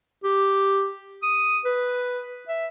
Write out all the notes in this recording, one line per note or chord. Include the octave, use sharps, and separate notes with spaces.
G4
D#6
B4
E5